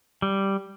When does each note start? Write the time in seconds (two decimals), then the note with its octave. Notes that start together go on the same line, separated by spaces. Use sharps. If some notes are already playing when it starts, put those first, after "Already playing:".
0.22 G3